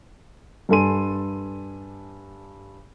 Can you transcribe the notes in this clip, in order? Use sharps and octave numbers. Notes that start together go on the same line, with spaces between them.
G2 D4 A4 G#5 C6 D#7